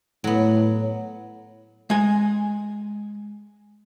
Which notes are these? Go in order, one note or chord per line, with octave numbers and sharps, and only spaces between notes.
A2 F#3 B3
G#3 G#5